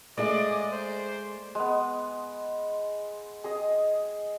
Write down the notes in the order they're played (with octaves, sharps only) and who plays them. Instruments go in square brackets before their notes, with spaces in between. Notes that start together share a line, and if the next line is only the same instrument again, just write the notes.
[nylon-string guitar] G#3 A3 G#4 [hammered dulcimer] D5 [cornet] D#5
[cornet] C5
[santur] G#3 B3
G#4 D#5 D#6